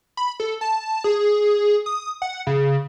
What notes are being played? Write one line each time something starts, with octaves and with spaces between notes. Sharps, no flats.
B5
A4
A5
G#4
D#6
F#5
C#3